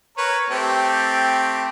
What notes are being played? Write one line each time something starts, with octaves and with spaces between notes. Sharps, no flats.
A#4 B4 C#5
A3 C4 G4